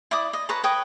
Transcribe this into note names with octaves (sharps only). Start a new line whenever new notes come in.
E4 D5 D6 D#6
D#5
B4 C#5 A5 A#5
B4 C#5 G5 D#6